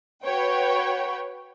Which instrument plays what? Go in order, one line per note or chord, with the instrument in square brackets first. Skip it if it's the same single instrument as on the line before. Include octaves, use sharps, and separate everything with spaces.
[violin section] F#4 B4 C#5 G5